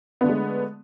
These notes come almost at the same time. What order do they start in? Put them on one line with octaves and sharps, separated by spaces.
B3 D3 A3 G#3